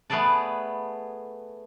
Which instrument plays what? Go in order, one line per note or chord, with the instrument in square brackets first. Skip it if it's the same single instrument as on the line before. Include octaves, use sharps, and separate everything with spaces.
[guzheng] A3 B3 G#4 A4 D5 A5